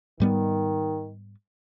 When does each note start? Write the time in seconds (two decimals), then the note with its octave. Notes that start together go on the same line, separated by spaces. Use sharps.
0.20 G#2 D#3 G3 B3